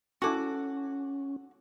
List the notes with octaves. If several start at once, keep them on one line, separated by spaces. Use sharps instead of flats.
C#4 E4 F#4 A4 C#6 D6